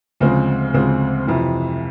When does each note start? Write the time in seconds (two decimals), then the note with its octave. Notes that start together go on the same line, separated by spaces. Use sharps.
0.20 D2 C#3 F3 G#3 C4
0.74 D2 C#3 F3 G#3 C4
1.27 F2 C3 E3